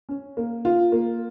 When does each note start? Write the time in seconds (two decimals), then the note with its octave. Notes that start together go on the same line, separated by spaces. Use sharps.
0.09 C#4
0.37 A#3
0.65 F4
0.92 A#3